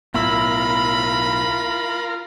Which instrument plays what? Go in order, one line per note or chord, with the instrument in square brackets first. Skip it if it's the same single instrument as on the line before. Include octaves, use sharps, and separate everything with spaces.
[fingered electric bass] B1 A2 B3 [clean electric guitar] E4 [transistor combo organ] F4 A#4 [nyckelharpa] B5